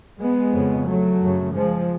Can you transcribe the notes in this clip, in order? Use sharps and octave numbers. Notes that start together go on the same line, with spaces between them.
G#3 B3
F2 C#3
F#3 A3
F#2 C#3
F3 G#3